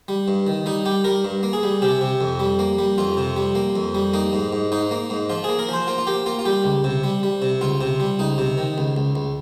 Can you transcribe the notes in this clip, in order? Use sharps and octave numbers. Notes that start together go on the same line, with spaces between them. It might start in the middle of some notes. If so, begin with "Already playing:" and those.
G3
G2
D#3
G3 D#4
G3 G4
G3 A#4
G2
A#3
G#4
G3
C3 G4
C3
F2
G3
A#3
G3
F2 F4
C3
G3
A#3
F2
G3
A#3 D#4
G#2
G#2
G#2 D#4
A#3
G#2
F3 F4
A#3 G#4
A#4
F3 C5
A#3 F4
F4
A#3 G4
A#3 F4
F4
G3 G4
C#2
C3
G3
G3
C3
C#2 F4
C3
G3
C#2 D#4
C3
D#3
C#2
C#2
C#2